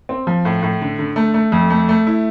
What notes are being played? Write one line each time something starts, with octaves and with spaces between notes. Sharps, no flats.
C4
F3
A2
A2
D3
D3
A3
A3
F2
A3
A3
E4